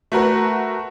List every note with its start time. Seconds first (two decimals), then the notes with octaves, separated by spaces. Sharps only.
0.12 A3 F#4 A#4 B4